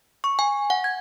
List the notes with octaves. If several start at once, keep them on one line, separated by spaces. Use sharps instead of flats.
C#6
G#5
F#5
G#6